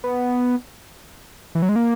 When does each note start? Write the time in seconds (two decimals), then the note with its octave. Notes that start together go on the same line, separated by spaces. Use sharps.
0.04 B3
1.55 E3
1.62 F#3
1.69 G#3
1.76 A#3